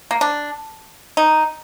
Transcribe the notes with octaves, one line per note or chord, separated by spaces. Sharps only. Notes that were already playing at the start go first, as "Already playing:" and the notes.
A#3
D4
D#4